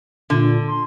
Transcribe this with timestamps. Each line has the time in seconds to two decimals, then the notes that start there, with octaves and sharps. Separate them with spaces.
0.30 A#2 D3
0.68 C6